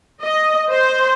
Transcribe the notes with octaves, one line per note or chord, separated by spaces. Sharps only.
D#5
C5